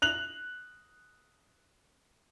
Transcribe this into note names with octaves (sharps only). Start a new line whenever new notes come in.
F#6 F7 F#7